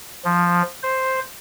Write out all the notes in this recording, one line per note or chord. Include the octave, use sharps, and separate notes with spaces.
F3
C5